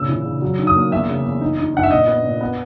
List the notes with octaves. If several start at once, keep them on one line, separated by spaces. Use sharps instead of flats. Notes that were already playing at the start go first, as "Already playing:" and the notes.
Already playing: A#2 C#3 E6
E3
C#3
F#3
D#3
D#6
A#3
E2 E5
C#3
E2
D#4
D#4
D#4 F#5
E5
A#2 D#5
B3
A#2
B3